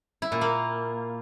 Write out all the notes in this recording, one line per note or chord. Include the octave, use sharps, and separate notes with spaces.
E4
A#2
A#3